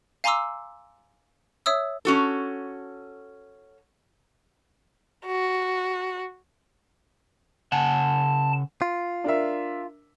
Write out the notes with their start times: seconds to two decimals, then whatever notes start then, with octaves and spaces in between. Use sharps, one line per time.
0.24 F5 G#5 A#5 C6 D6 E6
1.66 C#5 E5 D#6 E6
2.05 C#4 F#4 A4
5.26 F#4
7.72 C#3 F#5 G#5 A5
8.82 F4
9.24 D4 A#4 E5